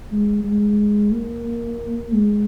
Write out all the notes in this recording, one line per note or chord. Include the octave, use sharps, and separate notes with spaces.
G#3
G#3
A#3
G#3